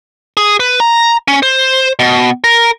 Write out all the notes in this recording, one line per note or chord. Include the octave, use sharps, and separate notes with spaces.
G#4
B4
A#5
C#4
C5
B2
A#4